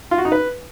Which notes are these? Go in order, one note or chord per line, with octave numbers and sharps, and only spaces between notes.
F4
F#4
D#4
B4